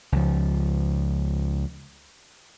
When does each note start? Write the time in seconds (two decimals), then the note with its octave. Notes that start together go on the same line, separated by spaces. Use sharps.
0.12 C#2 F3